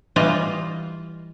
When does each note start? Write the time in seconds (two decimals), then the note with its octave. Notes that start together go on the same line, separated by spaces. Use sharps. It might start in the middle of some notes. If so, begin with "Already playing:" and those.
0.16 E3 G3 F4 D#5